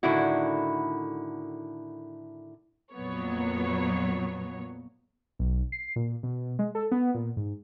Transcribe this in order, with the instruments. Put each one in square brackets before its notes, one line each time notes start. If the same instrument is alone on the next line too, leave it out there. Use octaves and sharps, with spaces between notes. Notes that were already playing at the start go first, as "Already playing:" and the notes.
[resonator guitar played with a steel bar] A2 D3 D#3 E4 F#4
[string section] F2 A#2 F#3 B3 C#5
[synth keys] B1
C7
A#2
B2
G#3
A4
B3
A#2
G#2